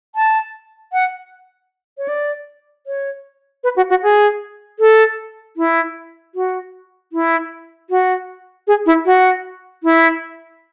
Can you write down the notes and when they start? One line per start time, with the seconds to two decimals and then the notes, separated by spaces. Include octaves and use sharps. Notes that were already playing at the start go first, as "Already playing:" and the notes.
0.15 A5
0.93 F#5
1.98 C#5
2.08 D5
2.87 C#5
3.64 B4
3.76 F#4
3.90 F#4
4.03 G#4
4.79 A4
5.57 E4
6.35 F#4
7.13 E4
7.90 F#4
8.67 G#4
8.86 E4
9.06 F#4
9.83 E4